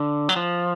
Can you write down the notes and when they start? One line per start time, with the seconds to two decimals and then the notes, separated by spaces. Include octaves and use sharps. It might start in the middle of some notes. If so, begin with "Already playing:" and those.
Already playing: D3
0.29 F#3
0.36 F3